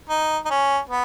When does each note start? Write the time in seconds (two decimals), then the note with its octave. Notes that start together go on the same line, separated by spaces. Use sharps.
0.09 D#4
0.45 D#4
0.50 C#4
0.89 B3